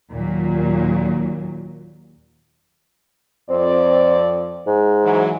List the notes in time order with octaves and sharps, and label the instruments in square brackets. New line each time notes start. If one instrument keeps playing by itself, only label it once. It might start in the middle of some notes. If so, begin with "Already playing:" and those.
[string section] D#2 A#2 F#3
[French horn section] F2 D5 [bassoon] C4
[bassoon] G#2
[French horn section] E3 F#3